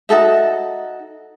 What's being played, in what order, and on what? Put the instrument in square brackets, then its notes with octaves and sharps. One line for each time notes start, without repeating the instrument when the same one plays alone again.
[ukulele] D#4 F#4 A4 E5